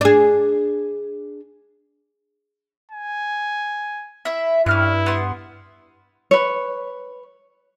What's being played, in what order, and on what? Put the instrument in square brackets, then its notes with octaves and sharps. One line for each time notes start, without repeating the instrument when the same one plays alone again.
[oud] D4 G#4
[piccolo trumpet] G#5
[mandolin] E4 E5
[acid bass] G2 [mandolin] C#4 F6 F#6 [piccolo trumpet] E4
[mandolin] B3 C6
[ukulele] B4 C#5